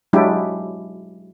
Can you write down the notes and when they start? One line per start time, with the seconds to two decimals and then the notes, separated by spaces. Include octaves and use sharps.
0.13 F#3 G#3 D4 E4 G4